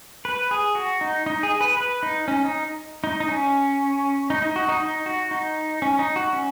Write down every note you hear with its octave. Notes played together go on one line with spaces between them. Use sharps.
B4
G#4
F#4
D#4
D#4
G#4
B4
B4
D#4
C#4
D#4
D#4
D#4
C#4
D#4
D#4
F#4
D#4
D#4
F#4
D#4
C#4
D#4
F#4
C#4